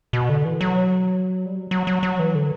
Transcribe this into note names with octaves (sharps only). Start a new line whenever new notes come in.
B2
D3
E3
F#3
G3
F#3
F#3
F#3
F#3
E3
D3